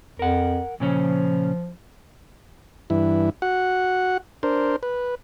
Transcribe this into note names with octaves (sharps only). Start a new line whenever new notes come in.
F2 A#4 F#5
A#2 C#3 F3 C#4
G2 E3 E4
F#4 F#5
D4 A#4 C5
B4